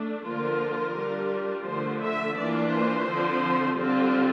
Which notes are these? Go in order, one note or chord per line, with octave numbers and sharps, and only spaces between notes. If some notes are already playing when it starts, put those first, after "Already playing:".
Already playing: A3 D4
D3 F3 A#3 F4 A#4
G3 D4 F4
D3 F3 A3 C5
E5
E3 A#3 D4 F4 D5
C5
D3 F3 C4
D3 G3 C4 F4 A4